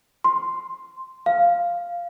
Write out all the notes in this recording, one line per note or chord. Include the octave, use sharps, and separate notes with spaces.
C6
F5